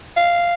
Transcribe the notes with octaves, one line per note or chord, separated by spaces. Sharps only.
F5